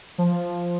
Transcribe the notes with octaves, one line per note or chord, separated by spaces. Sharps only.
F3